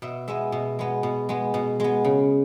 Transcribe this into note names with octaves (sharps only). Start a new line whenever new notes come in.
B2 E5
G#3 B3 E5
B2
G#3 B3
B2
G#3 B3
B2
G#3 B3
C#3